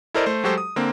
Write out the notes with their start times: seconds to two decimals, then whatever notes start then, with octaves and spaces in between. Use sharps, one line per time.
0.14 E4 A4 A#4 C5 D5 D#5
0.26 A3 C5
0.44 F#3 G#3 F#4 G4 A4 C5
0.58 D#6
0.76 D3 A#3 C4